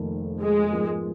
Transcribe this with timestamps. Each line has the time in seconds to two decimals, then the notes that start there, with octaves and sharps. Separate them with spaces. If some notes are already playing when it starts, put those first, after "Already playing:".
Already playing: F1 F2 D#3 A#3
0.43 G#3
0.72 G#2 F3 B3 D#4 A#4